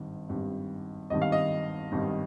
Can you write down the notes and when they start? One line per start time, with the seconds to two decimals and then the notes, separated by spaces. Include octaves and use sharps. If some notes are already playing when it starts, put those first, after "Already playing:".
Already playing: G#1 G2 D#3
0.29 G#1 G2 D#3
1.10 G#1 G2 D#3 D#5
1.22 F5
1.32 D#5
1.92 G#1 G2 D#3